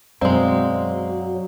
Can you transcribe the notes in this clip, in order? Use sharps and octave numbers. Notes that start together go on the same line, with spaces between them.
F#2 B2 F#3 G#3 C4 D5 F5 A#5